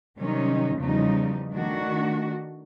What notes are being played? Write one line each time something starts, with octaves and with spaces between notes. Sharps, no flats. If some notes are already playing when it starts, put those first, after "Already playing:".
C3 D#3 F#3 G3 C#4 D#4
E2 C#3 F3 G3 D#4
D#3 A3 D4 F#4